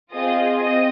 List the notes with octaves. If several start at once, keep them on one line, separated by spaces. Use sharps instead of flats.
C4 F4 G#4 D#5
C4 D#5